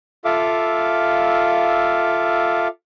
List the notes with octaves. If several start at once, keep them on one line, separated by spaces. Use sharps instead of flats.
F4 A4 E5 F5 D6